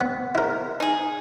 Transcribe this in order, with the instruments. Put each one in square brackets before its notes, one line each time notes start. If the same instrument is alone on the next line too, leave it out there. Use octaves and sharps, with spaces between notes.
[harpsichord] B3
E4 A#4
[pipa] D#4 G#4